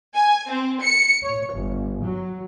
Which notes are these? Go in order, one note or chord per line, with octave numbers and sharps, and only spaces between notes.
G#5
C4
C#7
C#5
G1
F#3